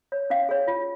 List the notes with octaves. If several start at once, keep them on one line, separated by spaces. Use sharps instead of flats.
C#5
C#4 F5
G#4 C#5
F4